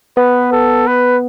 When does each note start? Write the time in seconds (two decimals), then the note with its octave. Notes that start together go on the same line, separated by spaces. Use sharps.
0.17 B3 B4
0.52 A4
0.87 B4